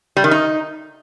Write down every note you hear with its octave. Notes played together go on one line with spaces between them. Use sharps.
G3
D#3
D#4